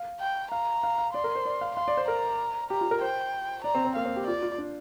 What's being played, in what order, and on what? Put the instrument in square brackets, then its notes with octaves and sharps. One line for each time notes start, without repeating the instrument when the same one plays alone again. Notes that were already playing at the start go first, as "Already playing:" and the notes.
Already playing: [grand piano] F5
[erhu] G5
[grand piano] F5 [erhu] A#5
[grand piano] F5
F5
[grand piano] D5 [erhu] C6
[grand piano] A#4
C5
D5
F5
[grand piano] F5 [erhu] C6
[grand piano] D5
C5
[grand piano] A#4 [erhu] A#5
[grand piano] G4 [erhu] A#5
[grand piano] F4
A#4
[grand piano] C5 [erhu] G5
[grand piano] D5 [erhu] A#5
[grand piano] C4
C4
[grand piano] A#3 [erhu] F5
[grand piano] C4
G4
[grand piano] F4 [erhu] D5
[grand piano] F4
D4